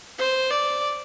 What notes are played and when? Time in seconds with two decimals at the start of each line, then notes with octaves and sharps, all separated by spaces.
0.18 C5
0.50 D5